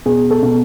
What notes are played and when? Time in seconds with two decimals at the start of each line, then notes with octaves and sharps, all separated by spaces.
0.06 B2 G#4
0.30 A4
0.43 B2